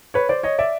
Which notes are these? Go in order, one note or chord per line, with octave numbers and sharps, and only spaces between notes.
B4 C#5
C5 D5
C#5 D#5
D5 E5